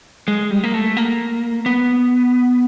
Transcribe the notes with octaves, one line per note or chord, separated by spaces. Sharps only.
G#3
G3
A#3
A3
A#3
B3